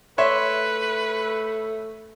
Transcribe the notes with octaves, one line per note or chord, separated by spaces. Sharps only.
A3 B4 C#5 E5 C6